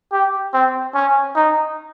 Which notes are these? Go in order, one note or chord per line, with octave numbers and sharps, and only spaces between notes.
G4
C4
C#4
D#4